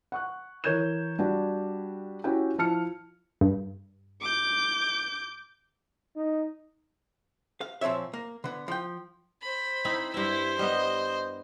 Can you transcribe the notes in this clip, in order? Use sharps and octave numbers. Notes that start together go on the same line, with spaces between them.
F#5 C#6 F#6
E3 A#4 C#5 G6 G#6 E7
G3 D4 F#4 G4
C#4 E4 F#4 G4 G5
F3 E4 A5 F6 C#7
G2
D6 G6
D#4
F5
A#2 F3 C4 C#5 E5
A#3
D3 B3
F3 G5
C5 B5
C4 D#4 E4
G2 E4 C5 E5
G3 B3 D#5